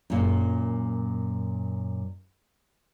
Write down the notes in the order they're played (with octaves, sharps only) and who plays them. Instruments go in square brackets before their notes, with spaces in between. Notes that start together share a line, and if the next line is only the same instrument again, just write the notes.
[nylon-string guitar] F#2 A#2